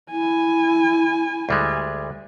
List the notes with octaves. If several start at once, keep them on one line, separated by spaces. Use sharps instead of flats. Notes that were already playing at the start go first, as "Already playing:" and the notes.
E4 G#5
D2 G3 G#3